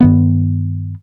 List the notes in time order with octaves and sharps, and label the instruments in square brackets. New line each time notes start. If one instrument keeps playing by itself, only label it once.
[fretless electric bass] G2 D#3 B3